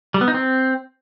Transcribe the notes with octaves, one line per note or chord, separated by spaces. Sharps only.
G3
B3
D#4
C4